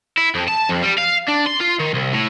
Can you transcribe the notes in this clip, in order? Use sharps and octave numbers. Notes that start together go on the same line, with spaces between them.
E4
F2
A5
F2
G3
F5
D4
C6
F4
D#3
C2
A2